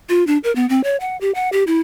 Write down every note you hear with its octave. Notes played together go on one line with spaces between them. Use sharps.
F4
D4
A#4
B3
C4
C#5
F#5
G4
F#5
G4
E4